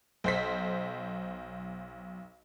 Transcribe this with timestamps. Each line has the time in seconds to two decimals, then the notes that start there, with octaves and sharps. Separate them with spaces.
0.24 B1 C5 B6